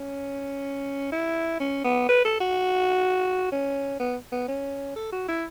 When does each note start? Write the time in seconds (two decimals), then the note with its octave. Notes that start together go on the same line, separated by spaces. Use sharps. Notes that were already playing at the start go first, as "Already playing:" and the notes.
Already playing: C#4
1.12 E4
1.60 C#4
1.84 B3
2.09 B4
2.25 A4
2.40 F#4
3.52 C#4
4.00 B3
4.32 B3
4.48 C#4
4.96 A4
5.12 F#4
5.28 E4